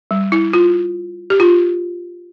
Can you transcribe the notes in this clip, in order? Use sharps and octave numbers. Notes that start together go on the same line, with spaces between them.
G3
E4
F4
G4
F4